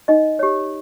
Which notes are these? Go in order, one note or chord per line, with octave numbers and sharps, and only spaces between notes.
D#4 D#5
G4 C#5